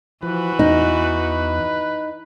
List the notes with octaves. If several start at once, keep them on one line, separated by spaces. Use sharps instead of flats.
E3 F3 F#4 B4
E2 D#4